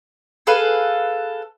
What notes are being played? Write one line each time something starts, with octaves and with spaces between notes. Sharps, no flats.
G#4 A4 B4 F5